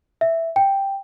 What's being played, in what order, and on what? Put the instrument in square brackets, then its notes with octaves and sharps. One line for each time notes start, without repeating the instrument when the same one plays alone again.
[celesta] E5
G5